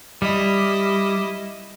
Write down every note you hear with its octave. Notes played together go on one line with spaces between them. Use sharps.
G3 E4 D#5